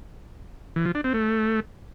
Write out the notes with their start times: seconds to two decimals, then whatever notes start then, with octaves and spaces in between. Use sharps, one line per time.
0.76 E3
0.85 F3
0.95 D4
1.04 C4
1.14 A3